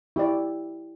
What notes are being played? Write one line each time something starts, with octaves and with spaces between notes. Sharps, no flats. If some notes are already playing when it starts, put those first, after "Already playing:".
E4 G4 D5